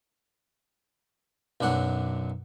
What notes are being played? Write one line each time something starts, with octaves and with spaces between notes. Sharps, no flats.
B1 F#2 D4 F#5